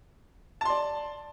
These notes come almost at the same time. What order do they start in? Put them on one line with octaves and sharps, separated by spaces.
A5 C6 D5